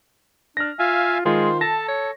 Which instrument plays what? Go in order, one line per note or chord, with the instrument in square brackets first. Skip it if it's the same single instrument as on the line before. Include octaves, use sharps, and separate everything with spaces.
[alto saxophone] D4 [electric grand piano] F6 A#6
[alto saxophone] F4 [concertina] E5 F5 G#5
[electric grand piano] D#3 F4 [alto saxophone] G#3 [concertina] C5
[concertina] A4 [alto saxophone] A5 [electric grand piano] A#6
[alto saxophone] C#5